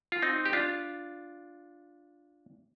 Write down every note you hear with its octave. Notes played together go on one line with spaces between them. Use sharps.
F4
C4 D#4
G4
D4 F4